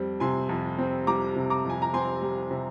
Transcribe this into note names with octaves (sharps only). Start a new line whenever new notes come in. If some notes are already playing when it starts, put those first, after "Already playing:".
Already playing: F2 G3 C4
C3 G#5 C6
F2
C4
G3 A#5 D6
C3
A#5 D6
F2 G#5
A#5
C4 G#5 C6
G3
C3